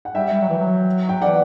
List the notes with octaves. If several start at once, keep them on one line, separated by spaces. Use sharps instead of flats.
F#5
G3 E5 G5
G3
F#3
E3
F#3
G5
E3 D5 F#5